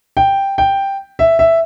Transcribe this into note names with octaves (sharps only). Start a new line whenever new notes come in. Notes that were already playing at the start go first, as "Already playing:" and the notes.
G5
G5
E5
E5